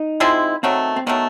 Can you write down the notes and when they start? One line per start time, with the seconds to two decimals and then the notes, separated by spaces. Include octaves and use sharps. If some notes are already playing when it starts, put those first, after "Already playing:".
Already playing: D#4
0.20 F3 G#3 C4 E4
0.63 D#3 F#3 A3 C4
0.96 C4
1.06 D#3 F#3 A3 B3